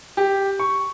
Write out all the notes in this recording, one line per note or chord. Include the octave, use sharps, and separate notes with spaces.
G4
C#6